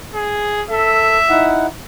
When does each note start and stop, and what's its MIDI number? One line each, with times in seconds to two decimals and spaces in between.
0.14 0.63 68
0.70 1.18 69
0.70 1.55 76
1.29 1.67 63
1.29 1.67 64
1.29 1.67 78